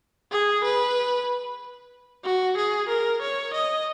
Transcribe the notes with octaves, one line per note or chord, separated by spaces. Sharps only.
G#4
B4
F#4
G#4
A#4
C#5
D#5